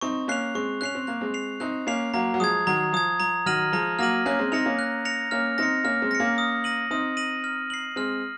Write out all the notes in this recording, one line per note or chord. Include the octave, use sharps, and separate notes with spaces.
C4 D#4 C#6
A#3 C#4 F#6 C7 F7
G#3 C4 C#6
C#4 F#6 C7 F7
C4
A#3 F#6
G#3 C4
C7 F7
C4 D#4 F#6
A#3 C#4 C7 F7
F#3 A#3 A#5
F#3
F3 G#3 D#6 G#6
D#3 F#3 A#5
F3 D#6 G#6
F3 A#5
D#3 F#3 F6 A#6 D#7 F#7
F3 G#3 A#5
F#3 A#3 F6 A#6 D#7 F#7
A#3 C#4 F#6
G#3 C4
C4 D#4 A#6 C#7 F7
A#3 C#4
F#6
A#6 C#7 F7
A#3 C#4 F6
C4 D#4 A#6 C#7
A#3 C#4 F6
G#3 C4
A#6 C#7
A#3 C#4
D#6
A#6 D#7 F#7
C4 D#4 D#6
A#6 D#7 F#7
F6
C7 F#7
G#3 C4 F6